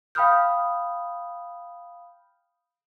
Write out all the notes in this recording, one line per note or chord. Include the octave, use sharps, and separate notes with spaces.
F5 G5 B5 D#6 F6 G6